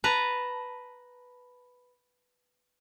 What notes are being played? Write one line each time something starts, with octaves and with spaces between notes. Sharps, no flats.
B4 A5 A#5